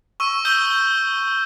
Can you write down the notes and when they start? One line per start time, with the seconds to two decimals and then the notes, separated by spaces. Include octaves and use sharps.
0.20 C#6 E6 D#7
0.45 D#6 E6 G6 D#7 G7